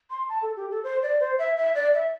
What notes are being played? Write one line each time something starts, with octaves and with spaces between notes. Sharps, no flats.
C6
A5
A4
G4
A4
C5
D5
C5
E5
E5
D5
E5